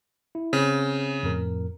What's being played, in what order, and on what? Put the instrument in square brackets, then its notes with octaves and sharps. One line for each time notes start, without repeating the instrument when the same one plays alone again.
[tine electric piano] E4
[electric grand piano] C#3 [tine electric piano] C4
[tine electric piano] F2 A2 A#4